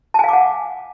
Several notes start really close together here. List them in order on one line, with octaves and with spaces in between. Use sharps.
A5 G#5 F5 D6 F#5